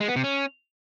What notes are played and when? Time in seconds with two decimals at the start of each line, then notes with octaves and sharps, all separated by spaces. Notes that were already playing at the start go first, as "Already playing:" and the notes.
0.01 G#3
0.08 B3
0.16 C3
0.24 C#4